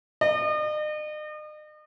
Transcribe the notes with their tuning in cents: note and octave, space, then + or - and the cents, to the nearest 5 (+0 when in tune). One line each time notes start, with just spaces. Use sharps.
D#5 -40